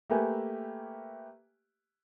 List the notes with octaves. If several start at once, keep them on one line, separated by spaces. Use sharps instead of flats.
A3 A#3 G4 B4 E5 G#5